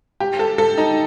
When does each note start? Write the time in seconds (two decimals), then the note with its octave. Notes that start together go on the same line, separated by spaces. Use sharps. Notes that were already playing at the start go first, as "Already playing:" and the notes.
0.20 G4
0.39 A4
0.58 A4
0.78 D#4